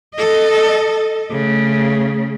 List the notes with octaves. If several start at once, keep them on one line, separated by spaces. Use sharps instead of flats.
A4 D#5
C#3 A3